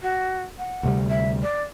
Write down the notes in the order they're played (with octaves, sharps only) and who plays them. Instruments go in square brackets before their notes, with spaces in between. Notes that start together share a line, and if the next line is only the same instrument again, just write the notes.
[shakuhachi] F#4
F#5
[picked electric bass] D2 C3 G3
[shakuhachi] E5
D5